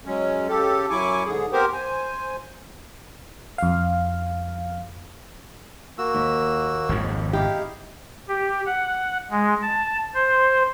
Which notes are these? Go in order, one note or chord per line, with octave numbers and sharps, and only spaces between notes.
F#3 G#3 C#4
C#3 G4 A4
F#2 F#3 E4 G#5 C#6 D6
G#2 D3 G#4
B3 C4 G4 A#4 C5
C5 G#5
F2 F5
A#3 F#4 E6
D#2
G#1 F2
D#4 E4 G4 F5
G4
F#5
G#3
A5
C5